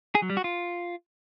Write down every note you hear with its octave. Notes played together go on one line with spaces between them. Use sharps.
G#4
F#3
G3
F#4
F4